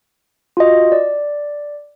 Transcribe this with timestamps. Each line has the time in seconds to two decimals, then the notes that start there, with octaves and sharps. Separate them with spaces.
0.57 F4 F#4 D#5
0.92 D5